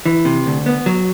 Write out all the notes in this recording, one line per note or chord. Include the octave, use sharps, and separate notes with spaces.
E3
C3
D2
B3
F#3